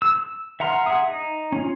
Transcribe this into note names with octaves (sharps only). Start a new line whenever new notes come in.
E6
E5 F#5 A#5 C6 F6
G#4 E5 F#5 D#6
D#4
C#4 F4